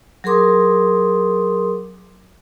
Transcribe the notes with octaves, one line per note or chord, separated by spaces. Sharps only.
F#3 G#4 A#4 C6 D6 D#6